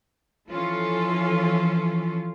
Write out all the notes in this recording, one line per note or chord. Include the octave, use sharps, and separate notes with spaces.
E3 F3 C#4 F4 A4